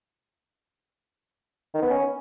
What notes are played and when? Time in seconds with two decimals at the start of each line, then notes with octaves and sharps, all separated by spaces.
1.74 D#3
1.82 B3
1.90 C#4